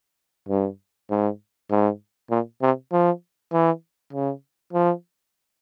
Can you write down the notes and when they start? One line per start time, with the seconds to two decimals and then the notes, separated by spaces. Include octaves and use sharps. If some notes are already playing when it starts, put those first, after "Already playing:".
0.48 G2
1.10 G#2
1.70 G#2
2.30 A#2
2.62 C3
2.92 F3
3.52 E3
4.13 C#3
4.73 F3